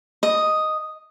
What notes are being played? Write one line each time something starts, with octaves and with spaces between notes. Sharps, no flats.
D#5